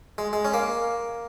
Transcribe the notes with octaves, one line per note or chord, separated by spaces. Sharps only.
G#3
G#3
C#4
A#3